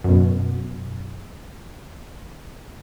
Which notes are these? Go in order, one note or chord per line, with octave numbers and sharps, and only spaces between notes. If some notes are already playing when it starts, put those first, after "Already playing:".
F#2 B2